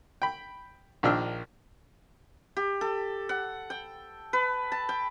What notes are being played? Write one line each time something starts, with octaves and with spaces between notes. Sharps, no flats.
G5 B5
A#1 D#3 F3 D4 E6 F6
G4
A4
F#5
G5
B4
A5
G5